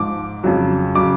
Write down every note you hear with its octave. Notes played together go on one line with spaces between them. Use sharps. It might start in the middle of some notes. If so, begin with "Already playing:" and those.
Already playing: G#2 F3 D6
F2 C#3 F#3
C#3 F#3 D6